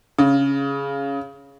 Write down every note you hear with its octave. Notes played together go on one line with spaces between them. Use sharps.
C#3